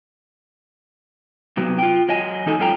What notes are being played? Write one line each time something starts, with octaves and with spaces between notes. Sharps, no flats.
C3 F#3 B3
F4 G5
F#3 D#5 G#5
E3 D#4 A4 G#5
F#2 C#4 F4 A4 G5 A#5